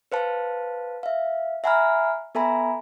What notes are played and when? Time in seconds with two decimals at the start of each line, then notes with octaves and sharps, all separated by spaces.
0.12 B4 C5 F5 A5
1.03 E5 F5
1.64 E5 F#5 G#5 A#5 B5 F6
2.35 B3 A4 E5 G#5 A#5 B5